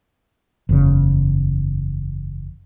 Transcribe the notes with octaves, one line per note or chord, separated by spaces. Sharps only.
F#1 E2 C#3